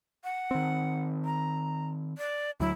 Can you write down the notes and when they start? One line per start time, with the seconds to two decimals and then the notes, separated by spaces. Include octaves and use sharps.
0.24 F#5
0.51 D#3 C4
1.25 A#5
2.18 D5
2.60 D2 F#3 E4